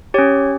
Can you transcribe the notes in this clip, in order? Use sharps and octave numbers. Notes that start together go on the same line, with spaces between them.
C#4 G4 C#5